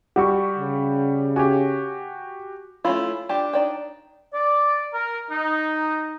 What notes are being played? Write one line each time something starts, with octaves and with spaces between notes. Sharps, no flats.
G3 F#4 G4 C#6
C#3
F#4 G4 G#5 D6
A3 C#4 E4 F4
D4 F4 G4
D#4 D5 G5
D5
A#4
D#4